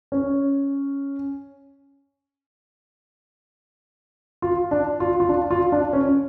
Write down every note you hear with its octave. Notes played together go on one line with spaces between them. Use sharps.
C#4
F4
D4
F4
F4
D4
F4
D4
C#4